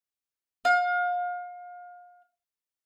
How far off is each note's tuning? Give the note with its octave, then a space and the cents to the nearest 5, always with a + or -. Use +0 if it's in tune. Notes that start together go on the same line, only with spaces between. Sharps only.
F5 +35